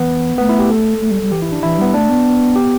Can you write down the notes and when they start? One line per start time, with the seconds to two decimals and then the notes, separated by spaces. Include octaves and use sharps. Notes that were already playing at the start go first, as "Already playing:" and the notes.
Already playing: E3 B3
0.38 A3 B3
0.49 E4
0.59 G4
0.70 A4
1.01 A3
1.11 G3
1.22 G3
1.32 E3 G4
1.42 E4
1.52 D4
1.62 E3 E4
1.78 G3 B3
1.94 A3 D4
2.09 B3
2.56 G4